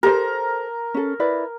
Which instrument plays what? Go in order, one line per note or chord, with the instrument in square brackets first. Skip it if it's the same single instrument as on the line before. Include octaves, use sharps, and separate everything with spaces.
[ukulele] G4 A4 C5 [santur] A#4
[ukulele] C#4 A4
E4 B4 D5